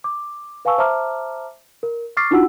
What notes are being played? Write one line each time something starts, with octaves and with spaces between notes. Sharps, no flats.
D6
B4 F5 G#5 A5 C#6 E6
C5 E5 A5 A#5 D6 F6
A#4
C#6 D6 F6 A6 C7
D4 D#4 F4 F#4 F#5 E6